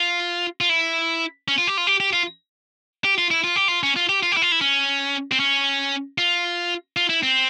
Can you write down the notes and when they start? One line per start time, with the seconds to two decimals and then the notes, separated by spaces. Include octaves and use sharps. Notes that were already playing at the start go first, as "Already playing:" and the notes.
Already playing: F4
0.61 F4
0.69 E4
1.48 C#4
1.58 F4
1.67 G4
1.77 F4
1.87 G4
2.00 G4
2.13 F4
3.04 G4
3.18 F4
3.31 E4
3.44 F4
3.56 G4
3.68 F4
3.83 C#4
3.96 F4
4.09 G4
4.23 F4
4.32 G4
4.37 E4
4.42 F4
4.52 E4
4.61 C#4
5.32 C4
5.40 C#4
6.18 F4
6.97 F4
7.09 E4
7.23 C4